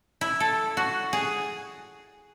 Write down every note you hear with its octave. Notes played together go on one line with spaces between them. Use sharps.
E4
A4
F#4
G#4